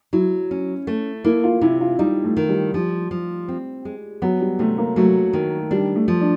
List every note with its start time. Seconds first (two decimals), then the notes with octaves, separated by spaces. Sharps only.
0.13 F#3 E4
0.51 C#4
0.87 A3
1.24 A#3 E4
1.44 F4
1.61 C3 E4
1.81 F4
1.99 G3 D#4
2.24 A3
2.37 D#3
2.49 G3
2.74 F3 G3
3.11 F3
3.48 C4
3.85 G#3
4.22 F#3 B3
4.41 G3
4.59 C3 A3
4.78 A#3
4.96 F#3 A3
5.33 D#3
5.71 G3 D4
5.95 A3
6.08 F3
6.21 D4